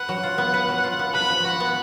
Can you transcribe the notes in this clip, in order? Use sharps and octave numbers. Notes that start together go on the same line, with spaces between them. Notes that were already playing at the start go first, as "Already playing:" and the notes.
Already playing: B4 F#5
F#3
F4
B3
B4
F#3
F4
B3
B4 B5
F3
F#4 F#5
B3